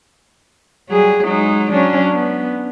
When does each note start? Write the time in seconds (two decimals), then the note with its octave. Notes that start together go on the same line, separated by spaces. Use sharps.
0.90 F#3 G3 G#4
1.24 F#3 G#3 D#4
1.72 F#3 C#4 D4
2.13 B3